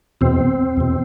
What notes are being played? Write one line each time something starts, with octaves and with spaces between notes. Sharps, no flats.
E2 B2 C4
E2 B2